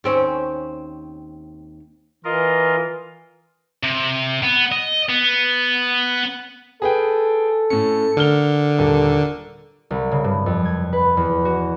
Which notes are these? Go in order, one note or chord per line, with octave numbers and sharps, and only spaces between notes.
D#2 C4 C#4
E3 F4 A#4 D#5
C3
B3
D#5
B3
G#4 A4 B4 G5
A2 C#4 C#7
D3 A#4 F6 G7
D#1 A4 A#4
C2
C#3
G2
F2
G#6
B4
E2
F#4